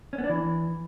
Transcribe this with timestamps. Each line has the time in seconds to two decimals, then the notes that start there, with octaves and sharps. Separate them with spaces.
0.13 C#4
0.18 B3
0.24 D4
0.29 E3